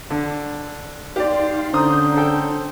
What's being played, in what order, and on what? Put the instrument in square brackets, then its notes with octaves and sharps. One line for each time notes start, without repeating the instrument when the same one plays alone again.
[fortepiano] D3
[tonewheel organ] D#4 F5 C6 [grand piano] G4 D5
[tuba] D3 [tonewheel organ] C#4 D4 G6 [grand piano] C5 A#5 D#6
[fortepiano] A4 G5